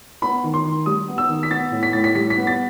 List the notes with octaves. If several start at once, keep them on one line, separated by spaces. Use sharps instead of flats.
B3 B5
D#3
C6
D#3
G3 D#6
B3
E6
D#3
B6
B3 A6
A2
B6
A2 A6
B6
G3 B6
B6
B3
A6